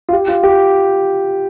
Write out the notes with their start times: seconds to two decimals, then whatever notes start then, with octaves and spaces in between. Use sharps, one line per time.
0.09 F4
0.13 G4
0.28 F4
0.43 G4